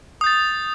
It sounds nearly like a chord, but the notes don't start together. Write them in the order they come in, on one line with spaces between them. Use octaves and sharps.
D#6 G6 A6